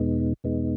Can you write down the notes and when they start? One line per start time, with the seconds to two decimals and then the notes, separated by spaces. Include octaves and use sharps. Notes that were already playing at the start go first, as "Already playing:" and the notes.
Already playing: E2 B2 G#3 B3 D#4
0.44 E2 B2 G#3 B3 D#4